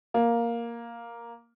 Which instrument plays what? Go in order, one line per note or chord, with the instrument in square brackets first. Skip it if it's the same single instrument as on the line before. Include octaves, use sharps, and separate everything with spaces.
[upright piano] A#3